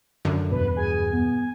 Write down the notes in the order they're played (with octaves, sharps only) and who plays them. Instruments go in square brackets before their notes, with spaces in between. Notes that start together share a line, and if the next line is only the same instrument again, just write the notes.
[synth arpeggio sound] F#2 D3
[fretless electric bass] E2 G2 B2 [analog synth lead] B4
[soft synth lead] G#4 [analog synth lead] G#5
[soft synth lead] B3